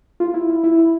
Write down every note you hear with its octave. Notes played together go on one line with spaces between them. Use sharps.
F4
E4
E4
E4
E4